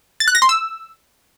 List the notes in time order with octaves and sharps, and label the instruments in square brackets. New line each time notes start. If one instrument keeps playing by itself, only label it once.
[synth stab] A6
F#6
A#6
C6
E6